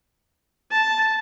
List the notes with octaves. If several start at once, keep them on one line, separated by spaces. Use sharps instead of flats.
A5